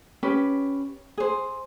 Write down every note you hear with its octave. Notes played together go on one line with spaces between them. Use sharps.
C#4 G4 B4
G#4 C5